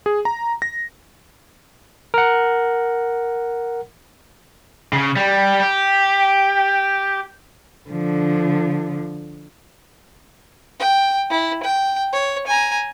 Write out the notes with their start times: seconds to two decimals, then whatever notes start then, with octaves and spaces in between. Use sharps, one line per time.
0.06 G#4
0.25 A#5
0.62 A#6
2.14 A#4 F#5
4.93 C#3
5.16 G3
5.61 G4
7.90 D3 F3
10.80 G5
11.30 E4
11.63 G5
12.13 C#5
12.47 G#5 A#5